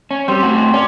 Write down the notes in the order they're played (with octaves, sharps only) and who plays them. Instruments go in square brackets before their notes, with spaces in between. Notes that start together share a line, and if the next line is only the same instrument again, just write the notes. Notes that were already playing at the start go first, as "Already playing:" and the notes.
[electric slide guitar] C#4
[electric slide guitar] G3 [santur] C4 G4
[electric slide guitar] A2 F#4
[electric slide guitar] C#4 [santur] D5